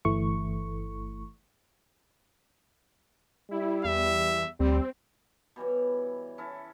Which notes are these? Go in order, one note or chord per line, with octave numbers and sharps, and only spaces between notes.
G1 E3 A3 C#6
G3 E4
E2 E5
D2 G3 C4
B2 E3 G3 C#5
C#4 E4 A4